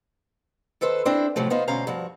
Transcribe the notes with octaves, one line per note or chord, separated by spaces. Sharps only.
D#3 A4 B4 C5
C4 D4 E4 C5
A2 C3 F3 F#3 A3
B3 D#4 F4 C5
D2 B2 C#4 C5 F5 A#5
G2 F3 F#4